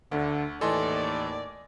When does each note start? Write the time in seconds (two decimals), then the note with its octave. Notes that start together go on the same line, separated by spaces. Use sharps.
0.11 D2 D3
0.61 D#2 A2 E3 A4 D5 D#5 G#5 C6